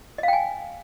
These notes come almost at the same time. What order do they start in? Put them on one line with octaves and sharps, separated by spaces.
D#5 F5 G5 G#5